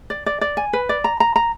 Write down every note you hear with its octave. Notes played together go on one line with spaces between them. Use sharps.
D5
D5
D5
G#5
B4
D5
A#5
A#5
A#5